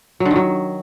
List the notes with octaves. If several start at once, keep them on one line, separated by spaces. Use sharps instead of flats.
F#3
D3
D#3
F#3